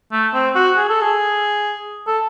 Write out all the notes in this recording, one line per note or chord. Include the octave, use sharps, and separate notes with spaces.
A3
C4
F#4
G#4
A4
G#4
A4